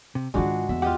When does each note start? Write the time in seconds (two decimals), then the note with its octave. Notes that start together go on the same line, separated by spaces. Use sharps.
0.15 C3
0.34 G#2 D#3 G#3 D4 F4 F#4
0.69 E2 E5
0.82 F4 G4 D#5 F#5